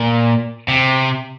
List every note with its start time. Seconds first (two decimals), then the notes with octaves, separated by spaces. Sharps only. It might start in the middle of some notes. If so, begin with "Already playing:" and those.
Already playing: A#2
0.68 C3